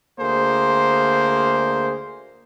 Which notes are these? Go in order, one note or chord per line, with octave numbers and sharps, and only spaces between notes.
D2 A#3 G#4 C5